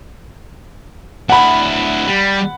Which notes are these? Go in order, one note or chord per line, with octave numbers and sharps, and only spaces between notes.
D2 E4 F#5 B5
G3